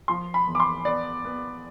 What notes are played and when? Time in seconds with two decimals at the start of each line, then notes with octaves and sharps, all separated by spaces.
0.08 F3 C6
0.34 B5
0.47 E2
0.55 D6
0.60 C6
0.85 B3 D5
1.25 B3